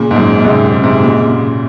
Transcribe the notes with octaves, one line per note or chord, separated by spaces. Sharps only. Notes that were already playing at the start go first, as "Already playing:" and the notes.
Already playing: A#2 C#3
G#2
F#2 A#2
G#2 C3
G#2 C3
A#2 C#3